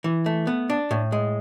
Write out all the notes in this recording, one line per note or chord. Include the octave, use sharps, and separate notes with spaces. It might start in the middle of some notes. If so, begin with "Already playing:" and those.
E3
A3
B3
D4
A2
G#3